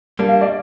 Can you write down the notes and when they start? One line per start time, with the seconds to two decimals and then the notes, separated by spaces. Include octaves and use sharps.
0.19 G3 A#3 D4
0.29 F5
0.41 D5